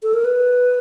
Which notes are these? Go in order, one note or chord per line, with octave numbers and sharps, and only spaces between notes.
A4
A#4
B4